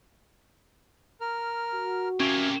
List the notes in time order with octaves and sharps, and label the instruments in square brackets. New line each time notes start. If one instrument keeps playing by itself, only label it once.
[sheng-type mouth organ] A#4 F6
[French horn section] F#4
[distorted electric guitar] C3 A#3 [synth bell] C#4 F7 G7 [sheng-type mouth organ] E5 G#5